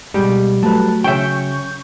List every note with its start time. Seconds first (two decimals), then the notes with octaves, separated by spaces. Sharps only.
0.14 B2 G3 G#3 G4
0.63 F#3 A3 B4 A5
1.04 C#3 C#4 E5 G5 C#6 G6